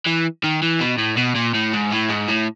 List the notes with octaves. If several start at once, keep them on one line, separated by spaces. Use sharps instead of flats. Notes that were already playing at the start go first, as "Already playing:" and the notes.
E3
D#3
E3
B2
A2
B2
A#2
A2
G#2
A2
G#2
A2